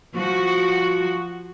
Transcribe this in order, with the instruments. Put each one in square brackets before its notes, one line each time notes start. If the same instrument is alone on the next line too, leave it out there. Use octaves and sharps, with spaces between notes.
[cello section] F3 F#4